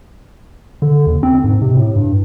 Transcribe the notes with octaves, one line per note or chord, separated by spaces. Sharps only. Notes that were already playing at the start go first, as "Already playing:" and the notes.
D3
D#2
C4
G#2
C3
A2
G2